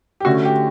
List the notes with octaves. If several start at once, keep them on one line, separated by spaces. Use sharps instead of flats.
G4
D3 A3 C#4 F#4
G4